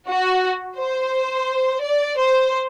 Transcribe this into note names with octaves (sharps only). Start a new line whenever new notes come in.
F#4
C5
D5
C5